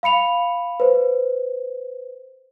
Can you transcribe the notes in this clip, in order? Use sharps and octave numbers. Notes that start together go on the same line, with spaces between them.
F5 B5 C#7 F7
B4 C5